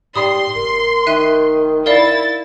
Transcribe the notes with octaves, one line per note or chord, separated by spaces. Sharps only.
G#2 G3 C6 D#6
F1 A#4
D#3 E5 F#6 D#7
E4 A#4 D5 F5 A6